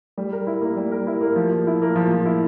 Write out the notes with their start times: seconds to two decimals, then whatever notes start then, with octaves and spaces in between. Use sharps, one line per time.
0.18 G3
0.32 A#4
0.47 E4
0.61 A#3
0.77 G3
0.92 A#4
1.07 E4
1.21 A#3
1.36 F3
1.51 F3
1.67 E4
1.82 A#3
1.96 F3
2.11 F3
2.25 E4